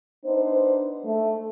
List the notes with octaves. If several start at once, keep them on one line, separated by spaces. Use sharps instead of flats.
B3 D4 D#4 C5
A3